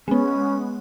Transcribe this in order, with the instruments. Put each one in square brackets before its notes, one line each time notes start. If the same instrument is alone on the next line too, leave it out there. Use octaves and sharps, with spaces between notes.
[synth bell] G#3 B3 [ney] C#4